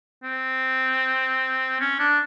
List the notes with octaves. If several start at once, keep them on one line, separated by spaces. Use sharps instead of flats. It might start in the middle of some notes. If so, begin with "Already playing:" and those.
C4
C#4
D4